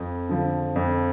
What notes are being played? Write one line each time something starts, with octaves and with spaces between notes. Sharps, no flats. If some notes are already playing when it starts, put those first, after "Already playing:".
Already playing: F2
D3 F3
F2